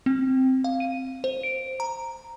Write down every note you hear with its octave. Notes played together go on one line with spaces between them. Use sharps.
C4
F5
D#7
C5
D7
A#5